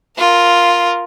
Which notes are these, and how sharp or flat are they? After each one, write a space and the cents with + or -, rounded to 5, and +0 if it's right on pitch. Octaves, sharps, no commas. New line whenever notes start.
F4 +0 A#4 +0